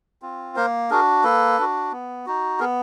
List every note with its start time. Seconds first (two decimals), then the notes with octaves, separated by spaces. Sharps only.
0.22 C4 F4
0.56 A#3 A#4 C5
0.90 D4 F#4 G#4 A#4
1.24 A#3 A4 B4
1.59 D4 F#4
1.92 B3
2.26 D#4 F#4
2.60 B3 G#4 A#4